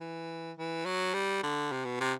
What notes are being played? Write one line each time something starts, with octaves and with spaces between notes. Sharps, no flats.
E3
E3
F#3
G3
D3
C3
B2
C3